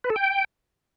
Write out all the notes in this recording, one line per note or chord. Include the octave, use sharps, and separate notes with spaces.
B4
A4
G5